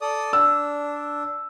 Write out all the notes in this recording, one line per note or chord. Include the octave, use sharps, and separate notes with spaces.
A4 D5 D#6
D4 E6